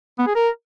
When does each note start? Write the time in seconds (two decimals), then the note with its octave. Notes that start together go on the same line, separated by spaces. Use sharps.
0.19 B3
0.27 G#4
0.35 A#4